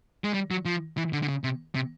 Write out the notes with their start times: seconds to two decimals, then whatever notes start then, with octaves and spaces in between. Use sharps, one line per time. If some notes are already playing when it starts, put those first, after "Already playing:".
0.24 G#3
0.34 G3
0.51 F#3
0.65 F3
0.97 E3
1.13 D3
1.23 D3
1.28 C#3
1.44 C3
1.75 C3